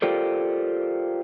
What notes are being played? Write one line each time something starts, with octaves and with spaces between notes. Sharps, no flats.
F4 G4 A4 A#4 C5 D5